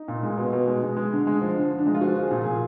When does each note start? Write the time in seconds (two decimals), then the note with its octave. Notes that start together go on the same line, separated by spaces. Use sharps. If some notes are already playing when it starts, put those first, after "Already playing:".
Already playing: D#4
0.08 A#2
0.23 G#3
0.37 B2
0.53 B2
0.67 G#3
0.83 G#3
0.97 G#3
1.13 D3
1.27 G#3
1.41 F3
1.57 D3
1.71 D3
1.79 D4
1.87 G#3 D#4
1.94 F4
2.01 F3 F#4
2.17 F3 G#4
2.31 A#2
2.42 A#2 G#4